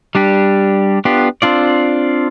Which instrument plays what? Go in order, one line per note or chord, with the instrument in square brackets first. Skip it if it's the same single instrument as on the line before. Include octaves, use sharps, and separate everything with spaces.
[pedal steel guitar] G3 D4 G4
B3 D4 F4 G4
C4 D4 F4 D5